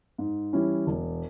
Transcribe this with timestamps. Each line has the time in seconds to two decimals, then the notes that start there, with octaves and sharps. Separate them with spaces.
0.18 G#2
0.53 E3 G3 C#4 E4
0.87 E1